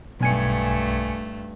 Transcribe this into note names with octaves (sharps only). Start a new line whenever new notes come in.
B1 G2 A3 G#5 C#7